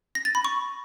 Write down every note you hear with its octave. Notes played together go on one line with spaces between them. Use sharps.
A#6
A6
B5
C#6